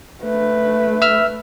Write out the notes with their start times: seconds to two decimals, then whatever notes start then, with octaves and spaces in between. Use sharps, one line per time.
0.23 A3 B4
1.02 E5 E6 F6